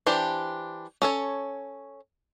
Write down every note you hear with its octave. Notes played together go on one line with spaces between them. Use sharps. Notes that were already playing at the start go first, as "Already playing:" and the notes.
E3 D4 G4 C5
C#4 A4 C#5